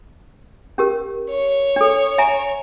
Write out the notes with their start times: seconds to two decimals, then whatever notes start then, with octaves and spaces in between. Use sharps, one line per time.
0.78 C#4 G4 A#4
1.30 C#5
1.76 D4 A4
2.18 E5 G#5 A#5